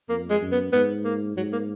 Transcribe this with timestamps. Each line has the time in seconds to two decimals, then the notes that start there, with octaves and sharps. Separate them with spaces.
0.09 F2 A#3
0.30 G#3
0.41 F#2
0.52 B3
0.73 G#2 B3
1.05 A#3
1.36 G#2 F#3
1.52 A#3